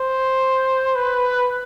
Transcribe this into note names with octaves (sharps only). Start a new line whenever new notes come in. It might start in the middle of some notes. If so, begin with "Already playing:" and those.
Already playing: C5
B4